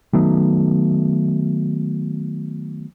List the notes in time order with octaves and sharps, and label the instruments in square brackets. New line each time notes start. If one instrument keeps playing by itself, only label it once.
[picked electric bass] D#3 F#3 A3 B3